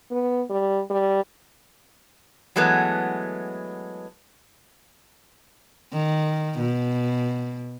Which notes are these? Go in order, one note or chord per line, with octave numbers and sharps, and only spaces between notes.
B3
G3
G3
E3 F#3 G#3 A3 B3
D#3
B2